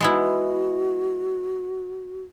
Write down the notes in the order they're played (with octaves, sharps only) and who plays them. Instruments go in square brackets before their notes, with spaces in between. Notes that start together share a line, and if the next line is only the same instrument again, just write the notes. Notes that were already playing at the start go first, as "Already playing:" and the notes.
[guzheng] G#3 B3 E4 [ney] F#4